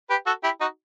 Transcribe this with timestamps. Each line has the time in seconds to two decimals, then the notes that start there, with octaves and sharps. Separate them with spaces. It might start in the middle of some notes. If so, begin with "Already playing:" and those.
0.10 G4 B4
0.26 F#4 A4
0.44 E4 G4
0.61 D#4 F#4